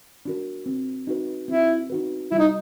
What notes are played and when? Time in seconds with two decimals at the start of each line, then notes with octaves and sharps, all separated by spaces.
0.25 D4 F#4 A#4
0.66 C4
1.07 D#4 F#4 B4
1.48 C4 E4
1.90 D#4 F#4 B4
2.31 G3 E4
2.39 D#4